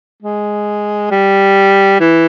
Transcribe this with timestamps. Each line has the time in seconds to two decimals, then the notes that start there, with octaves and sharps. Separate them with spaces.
0.23 G#3
1.11 G3
2.00 E3